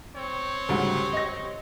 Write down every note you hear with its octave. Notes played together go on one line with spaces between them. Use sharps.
C4 C#5
D2 G#2 C#3 G3 C#4 G4
D#5 A#6